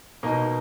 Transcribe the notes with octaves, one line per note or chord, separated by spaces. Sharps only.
B2 A#3 D#4